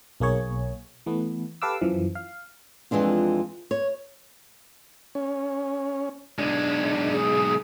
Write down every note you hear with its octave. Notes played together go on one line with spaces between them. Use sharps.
B1 A#3 G#4 C#5
E3 A3 B3
G4 A4 B4 F5 D6 E6
F#2 E3 F3
F5
F2 E3 G#3 D4 F4
C#5
C#4
B1 G#3 D4
G#4